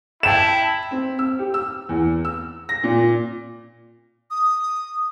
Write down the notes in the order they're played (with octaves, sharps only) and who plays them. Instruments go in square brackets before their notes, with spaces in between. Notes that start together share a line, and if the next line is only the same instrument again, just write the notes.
[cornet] E4 [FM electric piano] E5 G5 A5 [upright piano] E7
[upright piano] C4
E6
G4
E6
E2
E6
A#6
A#2
[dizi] D#6